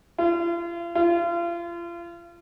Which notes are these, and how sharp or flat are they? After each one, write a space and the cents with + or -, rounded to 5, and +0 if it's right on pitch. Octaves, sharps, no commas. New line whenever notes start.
F4 -40
F4 -35